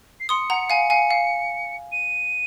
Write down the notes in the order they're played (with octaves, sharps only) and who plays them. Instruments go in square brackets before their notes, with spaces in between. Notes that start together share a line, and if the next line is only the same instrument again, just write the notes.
[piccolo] C7
[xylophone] C6 D#6 [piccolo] C#7
[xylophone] F#5 A#5
F5 G#5
F5 G#5
F5
[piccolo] D#7